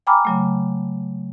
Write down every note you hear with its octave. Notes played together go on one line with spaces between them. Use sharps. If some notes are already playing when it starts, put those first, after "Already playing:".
G5 G#5 A#5 B5 D6 F6
C#3 F#3 A3